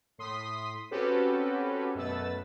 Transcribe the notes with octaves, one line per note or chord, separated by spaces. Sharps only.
A2 C6 D#6 B6
C4 C#4 F#4 G4 A4 B4
F#2 B2 A3 B4 E6 A6